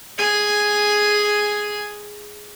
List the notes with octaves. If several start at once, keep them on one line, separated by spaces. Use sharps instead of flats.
G#4 G#5